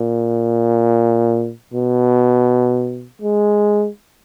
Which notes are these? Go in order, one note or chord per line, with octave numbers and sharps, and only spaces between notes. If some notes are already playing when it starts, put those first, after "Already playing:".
Already playing: A#2
B2
G#3